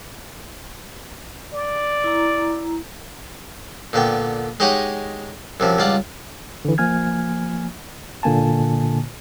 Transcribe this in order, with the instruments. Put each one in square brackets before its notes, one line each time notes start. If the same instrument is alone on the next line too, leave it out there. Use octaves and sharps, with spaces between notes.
[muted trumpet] D5
[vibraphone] E4 A#5
[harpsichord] A#2 D3 B3 G5
G#3 D#4 G4 C#5 F#5 G#5
F#2 C3 F3
C#2 G2 F4 D5 F#5
[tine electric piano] D3 E3
F3 A#3 G#5 F6 G#6
A#2 D3 A#3 G#5 A5